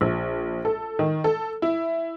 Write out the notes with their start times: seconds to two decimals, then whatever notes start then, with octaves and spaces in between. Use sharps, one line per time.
0.01 A#1
0.65 A4
0.99 D#3
1.24 A4
1.62 E4